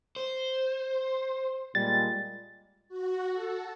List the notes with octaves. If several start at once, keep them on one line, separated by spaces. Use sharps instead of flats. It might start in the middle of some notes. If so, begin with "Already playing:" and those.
C5
A#2 G3 G#3 A6
F#4
A4